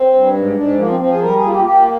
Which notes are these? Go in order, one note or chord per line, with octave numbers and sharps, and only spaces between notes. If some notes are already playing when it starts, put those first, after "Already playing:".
Already playing: C4
G2
G#2
G#2 D4
F3 A#3
C4
F3 C4
G#4
G3 A#4
G#4
A#3 F4
G4
F4
A#3 G4
F4